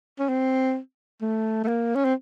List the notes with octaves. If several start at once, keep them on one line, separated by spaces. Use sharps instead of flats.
C#4
C4
A3
A3
A#3
C#4
C4